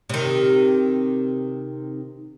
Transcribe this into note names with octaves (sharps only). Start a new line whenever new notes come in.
C3 D#3